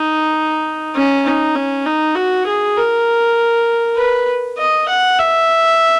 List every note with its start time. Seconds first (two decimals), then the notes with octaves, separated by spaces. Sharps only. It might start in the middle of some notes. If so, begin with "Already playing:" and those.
Already playing: D#4
0.95 C#4
1.26 D#4
1.55 C#4
1.86 D#4
2.16 F#4
2.47 G#4
2.77 A#4
3.97 B4
4.58 D#5
4.89 F#5
5.19 E5